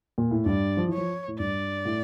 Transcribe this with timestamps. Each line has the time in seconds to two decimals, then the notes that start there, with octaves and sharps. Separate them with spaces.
0.18 A#2
0.31 A2
0.46 G2 D5
0.77 F3
0.88 E3
0.93 F3 C#5
1.28 A2
1.39 G2 D5
1.85 A2